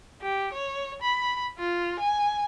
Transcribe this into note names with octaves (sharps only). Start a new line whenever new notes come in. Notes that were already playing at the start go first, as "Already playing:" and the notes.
G4
C#5
B5
F4
G#5